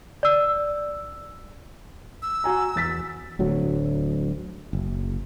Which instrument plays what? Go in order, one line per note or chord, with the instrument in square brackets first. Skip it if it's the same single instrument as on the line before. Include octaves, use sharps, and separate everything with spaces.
[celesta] D5 E6
[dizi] E6
[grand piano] F#4 G#5 A#5
E2 A6 B6
[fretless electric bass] D1 D2 F#3
F#1